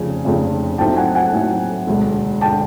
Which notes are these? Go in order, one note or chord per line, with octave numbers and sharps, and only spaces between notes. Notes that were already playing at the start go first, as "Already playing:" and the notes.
Already playing: F1 F2 C#3 G#5
F1 F2 C#3
A2 F#3 A3 C4 D#4 G5 A5
F#5 G#5
F#5 G#5
A2 F#3 A3 C4 D#4
E1 D2 D3
D3 G5 A5